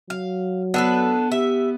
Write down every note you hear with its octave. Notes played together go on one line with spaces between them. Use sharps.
F#3 F5
B3 D4 A4 B4
G4 E5